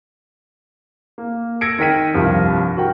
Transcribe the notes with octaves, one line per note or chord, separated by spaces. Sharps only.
A#3
E6 G#6 A#6 C#7 D7
D#3 A#4 G5 B6 D#7
C2 G2 F3
F#4 A#4 G5